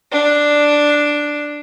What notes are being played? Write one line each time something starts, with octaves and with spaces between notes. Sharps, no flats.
D4